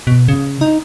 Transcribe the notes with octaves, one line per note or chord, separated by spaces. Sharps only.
B2
C#3
D#4